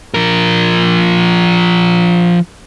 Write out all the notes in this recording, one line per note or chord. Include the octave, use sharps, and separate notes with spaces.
F3 A#4